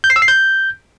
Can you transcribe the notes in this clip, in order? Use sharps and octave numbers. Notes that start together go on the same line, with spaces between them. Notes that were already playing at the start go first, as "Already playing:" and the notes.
G6
C7
E6
C7
G6